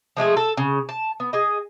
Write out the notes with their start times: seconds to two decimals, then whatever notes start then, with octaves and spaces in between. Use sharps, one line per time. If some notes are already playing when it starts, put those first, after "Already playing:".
0.17 F3 G#3 A3 G#4
0.37 A4
0.57 C#3
0.89 A5
1.20 B3
1.33 G#4 D#5